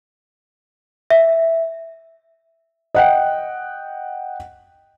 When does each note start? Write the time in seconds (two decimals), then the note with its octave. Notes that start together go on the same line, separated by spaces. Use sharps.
1.10 E5
2.95 D#5 F#5 G5